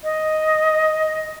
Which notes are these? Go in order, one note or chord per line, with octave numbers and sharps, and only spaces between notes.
D#5